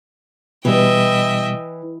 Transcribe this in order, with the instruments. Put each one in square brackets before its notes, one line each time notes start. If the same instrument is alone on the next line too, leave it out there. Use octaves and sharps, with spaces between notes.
[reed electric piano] B2 G3 [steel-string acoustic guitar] E3 [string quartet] D#5 E5 G5